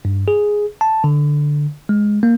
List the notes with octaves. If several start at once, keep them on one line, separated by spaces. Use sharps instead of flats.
G2
G#4
A5
D3
G#3
A#3